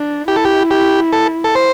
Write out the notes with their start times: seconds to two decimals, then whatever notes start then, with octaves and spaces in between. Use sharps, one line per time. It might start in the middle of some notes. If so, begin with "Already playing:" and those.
Already playing: D4
0.28 E4 G4
0.36 A4
0.45 G4
0.71 G4
1.13 A4
1.44 A4
1.55 C5